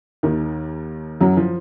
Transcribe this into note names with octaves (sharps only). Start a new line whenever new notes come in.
D#2 D#3
F#2 F#3
F3